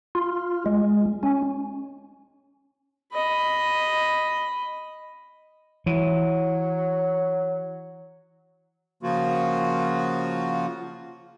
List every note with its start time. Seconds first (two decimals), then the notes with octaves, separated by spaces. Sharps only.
0.15 F4
0.66 G#3
1.23 C#4
3.13 D#5 B5
5.86 E3 F#3
9.03 C#3 F3 A#3 F4 F#4